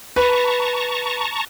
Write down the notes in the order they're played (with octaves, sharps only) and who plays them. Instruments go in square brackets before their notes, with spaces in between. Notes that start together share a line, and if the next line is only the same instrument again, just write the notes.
[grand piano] B4 [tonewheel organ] A5 A#5 C#6